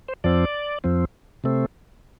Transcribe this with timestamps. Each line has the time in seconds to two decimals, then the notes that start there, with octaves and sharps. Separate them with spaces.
0.08 C5
0.24 F2 F3 C4 D5
0.84 F2 F3 C4
1.44 C3 A3 C4